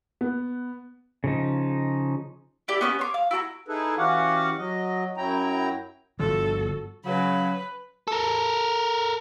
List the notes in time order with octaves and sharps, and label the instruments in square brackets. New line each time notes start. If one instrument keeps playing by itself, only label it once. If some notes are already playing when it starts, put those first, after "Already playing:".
[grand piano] B3
[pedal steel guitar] C#3 F3 D#4
[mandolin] E4 G4 D5
B3 C#4 E4 G4
C#5 C6 D6
F5
E4 F#4 A5 A#5
[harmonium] D#4 E4 G#4 A4 B4
E3 C#4 F#4 G4 F5 F#5
F#3 D#5
F#2 F#3 E4 G5 A#5
[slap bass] G1 D3 F3 [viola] F#4 A4
[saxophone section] C#3 F#3 [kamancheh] B4
[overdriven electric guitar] A4 A#4